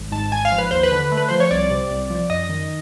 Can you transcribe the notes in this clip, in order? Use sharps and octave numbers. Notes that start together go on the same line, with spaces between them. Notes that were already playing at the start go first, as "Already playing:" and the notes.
Already playing: G#1
G#2 A5
G#1 G#5
F5
F3
B4
D#2 C5
B4
D3
A3
B4
F3 C5
C#5
C2 D5
C3
C2
F3
F#2 D#5
D#3